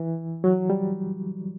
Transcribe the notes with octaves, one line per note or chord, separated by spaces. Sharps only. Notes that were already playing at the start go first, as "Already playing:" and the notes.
Already playing: E3
F#3
G3